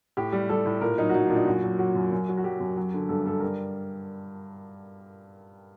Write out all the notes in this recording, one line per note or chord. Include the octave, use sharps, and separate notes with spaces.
A2 G4
G3
G3 A4
A2
A#2 A#4
F#3 D#4
F#4
F#3 D#4
A#2 D4
D#4
F#2 F#4
F#3
F#3 F#4
F#2
F#2
F#3
F#4
F#3 G4
F#2
F#3
D3
G2 A4
G2 A4
G3 A#4